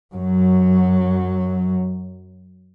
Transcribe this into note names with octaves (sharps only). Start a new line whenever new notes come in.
F#2 F#3